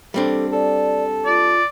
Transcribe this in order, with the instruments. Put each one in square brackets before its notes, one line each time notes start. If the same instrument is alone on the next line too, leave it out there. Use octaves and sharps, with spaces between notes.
[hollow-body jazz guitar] G3 C4 D4 [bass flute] A4
[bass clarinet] A4 [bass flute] D5
[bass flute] F4 [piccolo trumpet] D5